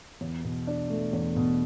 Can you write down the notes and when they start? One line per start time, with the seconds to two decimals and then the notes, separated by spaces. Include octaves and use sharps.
0.21 E2
0.44 B2
0.67 D4
0.90 A3
1.13 E2
1.36 B2